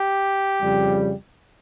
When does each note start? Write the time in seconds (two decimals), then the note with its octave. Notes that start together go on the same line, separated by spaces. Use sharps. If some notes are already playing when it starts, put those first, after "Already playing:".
Already playing: G4
0.62 F2 C#3 G3